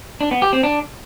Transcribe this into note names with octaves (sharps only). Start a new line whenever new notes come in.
D4
B3
G4
C4
D4